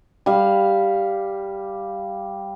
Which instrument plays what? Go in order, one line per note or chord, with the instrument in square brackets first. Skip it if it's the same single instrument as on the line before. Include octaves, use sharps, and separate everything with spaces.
[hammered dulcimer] G3 F5